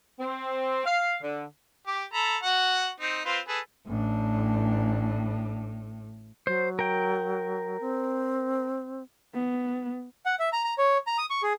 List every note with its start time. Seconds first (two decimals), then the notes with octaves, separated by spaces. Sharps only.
0.19 C4
0.86 F5
1.22 D3
1.87 G4 D6
2.13 A4 A#5 B5
2.43 F#4 F#5
3.00 C4 D#4
3.25 C4 F4 B4
3.48 G#4 A4 B4
3.88 A1 A2 D4
6.47 F#3 C5
6.79 A#4 G5
7.80 C4
9.34 B3
10.26 F#5
10.39 E5
10.53 A#5
10.64 A#5
10.78 C#5
11.07 A#5
11.18 D#6
11.30 C#6
11.43 G#4